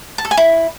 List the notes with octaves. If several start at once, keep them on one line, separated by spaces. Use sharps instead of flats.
A5
A4
G#5
E4